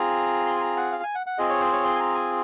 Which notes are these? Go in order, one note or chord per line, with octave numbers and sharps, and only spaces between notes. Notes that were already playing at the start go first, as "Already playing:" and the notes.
Already playing: C4 F4 G#4 A#5
C6
G#5
A#5
F#5
F5
G#5
F#5
F#5
C4 F4 G#4 D#5
C#5
C5
C#5
C6
G#5
A#5
G#5